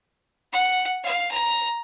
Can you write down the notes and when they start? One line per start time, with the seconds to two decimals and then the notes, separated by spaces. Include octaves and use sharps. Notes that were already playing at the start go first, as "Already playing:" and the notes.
0.52 F#5
1.03 F5
1.31 A#5